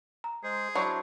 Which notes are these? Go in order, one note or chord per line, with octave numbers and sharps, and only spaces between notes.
A#5
G#3 G#4 C5
F#3 D4 E4 C5 D5 B5 C#6